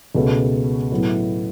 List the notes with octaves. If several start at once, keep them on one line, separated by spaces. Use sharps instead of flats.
C#2 B2 A3 C#4
A2 F#3 B3 E4